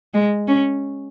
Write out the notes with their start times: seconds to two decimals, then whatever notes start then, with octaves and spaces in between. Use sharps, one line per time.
0.14 G#3
0.48 C#4